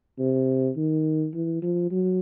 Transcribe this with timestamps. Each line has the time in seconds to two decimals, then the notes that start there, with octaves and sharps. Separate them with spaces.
0.19 C3
0.77 D#3
1.34 E3
1.62 F3
1.91 F#3